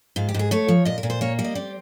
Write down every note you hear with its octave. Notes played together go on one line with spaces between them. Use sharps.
G#2 F4
G4
G#2 G#4
A3 C#5
F3
A#2 D#5
A#4
A#2
C5
A#3 C#5
G3
D#5
C4 D5